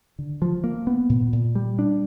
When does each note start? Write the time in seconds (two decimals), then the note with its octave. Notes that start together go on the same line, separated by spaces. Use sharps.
0.19 D3
0.42 F3
0.64 A#3
0.87 B3
1.09 A#2
1.33 A#2
1.55 G3
1.79 D4